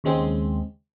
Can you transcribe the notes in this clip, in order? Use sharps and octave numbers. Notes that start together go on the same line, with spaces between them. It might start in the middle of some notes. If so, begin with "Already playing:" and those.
D#2 C#3 G#3 C4